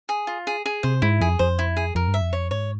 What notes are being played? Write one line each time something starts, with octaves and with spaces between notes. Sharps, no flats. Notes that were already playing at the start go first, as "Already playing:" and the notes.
G#4
F4
G#4
G#4
C3 C5
G#2 E4
F2 G#4
F2 C5
E4
G#4
F2 A#4
G2
E5
F2
C#5
G#2 C#5